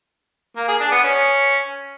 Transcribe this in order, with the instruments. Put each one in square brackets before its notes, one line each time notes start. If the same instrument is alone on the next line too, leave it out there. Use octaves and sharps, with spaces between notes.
[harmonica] A#3
G#4
D4
B3
C#4